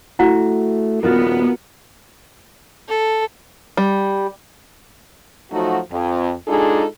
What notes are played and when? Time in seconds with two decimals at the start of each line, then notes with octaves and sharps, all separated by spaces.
0.19 A3 E4 F#4 F#5
1.03 D#1 B3 F4 F#4 A#4
2.88 A4
3.77 G3
5.52 F3 F#3 A3 D#4 F#4
5.91 F2
6.48 G#3 D4 D#4 F4 G#4 A4